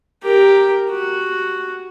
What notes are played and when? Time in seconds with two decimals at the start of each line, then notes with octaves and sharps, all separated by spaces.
0.23 G4 A#4
0.91 F#4